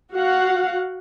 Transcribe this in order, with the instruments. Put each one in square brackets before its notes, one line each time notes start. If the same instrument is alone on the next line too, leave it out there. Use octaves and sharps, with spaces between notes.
[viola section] F#4 F5 F#5